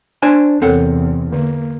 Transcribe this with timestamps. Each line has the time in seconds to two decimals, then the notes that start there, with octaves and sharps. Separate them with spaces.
0.23 D4 C5 G#5
0.62 E2 C3 C4 A4 A#4 C#5 F#5
1.33 D3 A#3